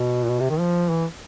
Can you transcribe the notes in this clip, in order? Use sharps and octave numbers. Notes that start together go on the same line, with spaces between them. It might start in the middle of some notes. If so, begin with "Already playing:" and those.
Already playing: B2
A#2
B2
C3
D#3
F3
E3